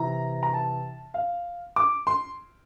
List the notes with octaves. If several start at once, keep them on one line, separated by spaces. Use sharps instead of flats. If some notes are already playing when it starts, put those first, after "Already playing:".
Already playing: C3 E3 A#5
A#5
A5
F5
D6
C6